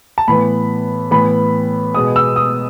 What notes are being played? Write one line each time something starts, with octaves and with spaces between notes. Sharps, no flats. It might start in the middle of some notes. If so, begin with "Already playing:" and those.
A5
A2 E3 B3 B5
A2 E3 B3 B5
B2 G#3 B3 D#6
E6
D#6